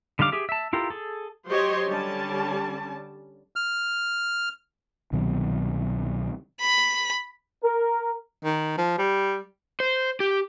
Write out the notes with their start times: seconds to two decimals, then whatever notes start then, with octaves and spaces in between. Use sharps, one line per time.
0.19 D3 G3 D#4 F5 D6
0.32 G4 G#4 E5
0.49 E5 A5
0.73 E4 F4 G4 A4 A#4
0.90 G#4 A4
1.48 F#3 G4 C5 C#5 D#5 C6
1.89 D3 G3 C#4 A5
3.56 F6
5.12 C2 B2 D#3 F#3
6.60 B5
7.64 A#4
8.44 D#3
8.78 F3
8.98 G3
9.80 C5
10.20 G4